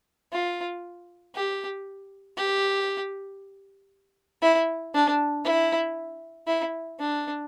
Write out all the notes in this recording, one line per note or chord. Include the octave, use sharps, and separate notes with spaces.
F4
G4
G4
E4
D4
E4
E4
D4